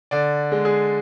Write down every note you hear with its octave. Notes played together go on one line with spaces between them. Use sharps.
D3 D5
G#3
G#4